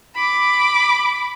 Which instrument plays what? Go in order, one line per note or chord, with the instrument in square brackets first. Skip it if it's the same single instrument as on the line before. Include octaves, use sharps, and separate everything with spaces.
[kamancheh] B5 D6